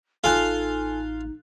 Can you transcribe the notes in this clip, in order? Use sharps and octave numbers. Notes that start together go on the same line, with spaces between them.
A1 D#4 F4 A4 F5 G#5 F#6